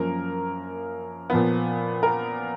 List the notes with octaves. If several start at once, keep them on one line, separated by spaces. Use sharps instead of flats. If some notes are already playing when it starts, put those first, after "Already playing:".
Already playing: F#2 F3 A#3 A#4
A#2 F3 B3
A#4